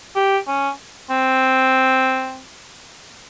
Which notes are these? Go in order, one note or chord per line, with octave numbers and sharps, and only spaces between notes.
G4
C#4
C4